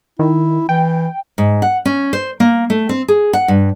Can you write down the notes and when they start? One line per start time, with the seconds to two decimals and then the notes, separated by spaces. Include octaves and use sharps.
0.19 D#3 E4
0.69 E3 G5
1.38 G#2
1.62 F#5
1.85 C#4
2.13 C5
2.40 A#3
2.70 A3
2.89 C4
3.08 G#4
3.33 F#5
3.48 G2